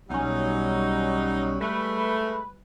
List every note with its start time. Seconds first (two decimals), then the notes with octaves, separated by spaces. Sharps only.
0.10 B1 F#3 G3 C#4 D#4
1.61 G#3 A3 B4